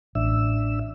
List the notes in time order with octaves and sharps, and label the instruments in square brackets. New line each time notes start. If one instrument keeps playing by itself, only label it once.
[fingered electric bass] A1 [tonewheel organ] D4 E5 E6